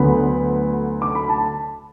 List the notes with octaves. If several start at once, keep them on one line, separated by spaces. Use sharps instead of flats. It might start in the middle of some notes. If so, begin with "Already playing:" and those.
Already playing: D2 D3 F#3 B3 B4 B5
D6
B5
A5